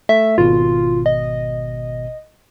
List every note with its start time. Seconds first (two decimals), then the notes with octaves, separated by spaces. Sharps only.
0.09 A3 E5
0.38 G#1 B2 F4
1.06 D#5